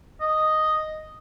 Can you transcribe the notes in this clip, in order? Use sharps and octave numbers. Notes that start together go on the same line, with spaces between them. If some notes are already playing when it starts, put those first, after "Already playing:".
D#5